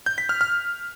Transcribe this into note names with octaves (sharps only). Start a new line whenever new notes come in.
G6
B6
F6
F6